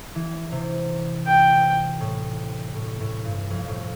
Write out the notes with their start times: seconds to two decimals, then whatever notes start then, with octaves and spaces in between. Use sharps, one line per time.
0.15 E3
0.52 C3
1.27 G5
2.00 A2
2.75 A2
3.00 A2
3.25 G2
3.50 F2
3.68 A2